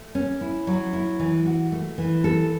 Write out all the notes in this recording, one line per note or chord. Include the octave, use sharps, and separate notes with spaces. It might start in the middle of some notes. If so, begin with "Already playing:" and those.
Already playing: A3
C#4
E4
F#3
E4
E3
F#4
A3
E3
A4